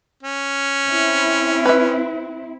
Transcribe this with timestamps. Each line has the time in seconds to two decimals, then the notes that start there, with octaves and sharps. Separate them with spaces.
0.23 C#4
0.87 C4 E4
1.66 B4 E5